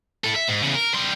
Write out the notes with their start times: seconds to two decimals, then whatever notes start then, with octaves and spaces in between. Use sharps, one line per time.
0.24 E4 A4
0.36 E5
0.48 G#2
0.63 E2 C#3
0.75 A#4
0.94 G3 C6